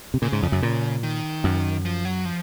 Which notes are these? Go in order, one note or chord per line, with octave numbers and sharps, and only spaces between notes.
C3
A#2 C#3
G#2
F2
F#2
A#2
D#3
F#2
F3
F#3
F3